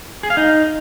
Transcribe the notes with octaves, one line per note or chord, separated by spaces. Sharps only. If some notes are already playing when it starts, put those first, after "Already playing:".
G#4
F5
D#4